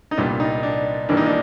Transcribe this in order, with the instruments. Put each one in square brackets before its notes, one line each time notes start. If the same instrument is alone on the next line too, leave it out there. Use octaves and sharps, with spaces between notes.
[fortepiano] D#4
C2 A#2 G3 B3 D4
D#4
D4
G#1 G2 E3 G3 A#3 D4
D#4
D4